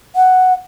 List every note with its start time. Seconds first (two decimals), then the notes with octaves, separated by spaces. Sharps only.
0.16 F#5